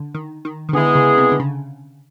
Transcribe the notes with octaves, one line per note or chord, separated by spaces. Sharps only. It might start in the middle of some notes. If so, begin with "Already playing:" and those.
Already playing: D3
D#3
D#3
D#3
D3 G#3 B3 E4 G#4
C#3
C3
D3
C#3